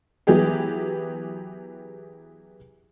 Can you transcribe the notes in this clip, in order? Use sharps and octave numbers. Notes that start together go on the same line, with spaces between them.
E3 F#3 B3 G4 G#4